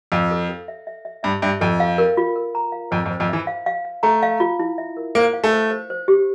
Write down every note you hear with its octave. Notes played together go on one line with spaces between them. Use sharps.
F2 F5
A4
A4
E5
E5
E5
G2 E5
G2 E5
F2 A4
F5
A#4
F4
A#4
A#5
F5
F2 C5
F2
C5
F2
E3 E5
F5
F5
F5
A3 A#5
F5
F4
E4
E5
A#4
A#3 C5
F5
A3
C5
C5
C5
G4